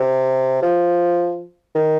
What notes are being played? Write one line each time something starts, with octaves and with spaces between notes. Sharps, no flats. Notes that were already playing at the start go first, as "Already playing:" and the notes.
Already playing: C3
F3
D#3